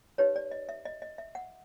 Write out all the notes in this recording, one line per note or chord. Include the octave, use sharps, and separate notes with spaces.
D#4 G4 B4 C#5
D5
D#5
E5
D#5
D#5
E5
F#5